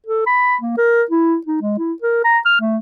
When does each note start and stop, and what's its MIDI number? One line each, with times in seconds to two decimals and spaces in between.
0.06 0.24 69
0.27 0.56 83
0.61 0.76 58
0.77 1.03 70
1.11 1.37 64
1.46 1.60 63
1.62 1.74 56
1.78 1.93 64
2.02 2.20 70
2.24 2.38 82
2.46 2.58 89
2.61 2.78 57